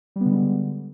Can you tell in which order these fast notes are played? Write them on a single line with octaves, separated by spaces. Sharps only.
G3 B3 D3 G#3